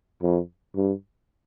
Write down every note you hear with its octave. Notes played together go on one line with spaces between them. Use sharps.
F2
G2